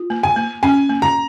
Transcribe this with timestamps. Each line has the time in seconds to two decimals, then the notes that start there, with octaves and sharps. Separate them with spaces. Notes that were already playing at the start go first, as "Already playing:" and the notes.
Already playing: F4
0.10 A#3
0.23 G#5
0.36 A#3
0.63 C#4 G#5
0.89 A#3
1.02 A#5